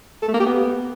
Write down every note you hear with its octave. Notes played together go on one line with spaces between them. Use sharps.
A4
A3
A#3
G4
B3